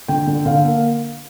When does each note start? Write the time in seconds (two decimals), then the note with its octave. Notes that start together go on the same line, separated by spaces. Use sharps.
0.08 D3 G5
0.27 D3
0.46 D3 F5
0.65 A#3